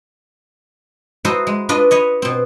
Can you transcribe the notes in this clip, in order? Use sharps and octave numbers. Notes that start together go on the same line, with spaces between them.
D#4 E4 F#4 A4 C5 D#5
G#3
D4 F4 B4 D5 D#5
B4 C#5 D#5
B2 C4